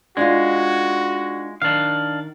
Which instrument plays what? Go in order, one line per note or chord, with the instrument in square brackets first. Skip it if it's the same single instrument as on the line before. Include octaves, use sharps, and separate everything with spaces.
[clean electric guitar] G#3 [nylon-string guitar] D4 D#4 F4 [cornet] F#4
[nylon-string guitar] D#3 [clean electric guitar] D4 F5